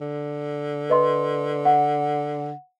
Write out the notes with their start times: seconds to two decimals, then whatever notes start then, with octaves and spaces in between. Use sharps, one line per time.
0.01 D3
0.90 B4 D#5 C6
1.65 F#5